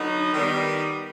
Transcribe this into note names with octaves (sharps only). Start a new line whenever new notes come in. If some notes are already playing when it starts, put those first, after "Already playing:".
Already playing: D3 F#3 B3 D#4
D#3 G3 B3